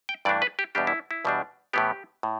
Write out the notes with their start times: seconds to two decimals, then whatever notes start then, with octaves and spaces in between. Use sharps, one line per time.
0.09 G5
0.25 G2 E3 A3 D4 D5
0.42 B4
0.59 G4
0.75 E2 B2 G3 D4 G4
0.87 E4
1.11 E4
1.25 E2 B2 G3 D4
1.73 A2 E3 B3 G4
2.23 A2